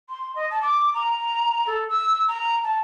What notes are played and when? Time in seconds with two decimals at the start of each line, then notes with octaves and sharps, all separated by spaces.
0.09 C6
0.36 D#5
0.51 A5
0.62 D6
0.94 A#5
1.67 A4
1.89 E6
2.28 A#5
2.64 A5